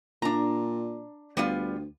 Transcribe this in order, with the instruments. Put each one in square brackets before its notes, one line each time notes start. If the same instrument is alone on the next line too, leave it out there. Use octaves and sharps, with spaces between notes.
[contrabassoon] A#2 [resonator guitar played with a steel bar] D4 A#5
[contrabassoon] D2 [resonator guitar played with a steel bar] G3 B3 F4